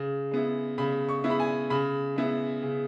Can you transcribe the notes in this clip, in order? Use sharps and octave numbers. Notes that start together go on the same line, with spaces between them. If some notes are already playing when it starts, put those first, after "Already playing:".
Already playing: C#3
G#3 B3 E4
C#3 B5
C#6
G#3 B3 E4
B5
G#5
C#3 B5
G#3 B3 E4
C#3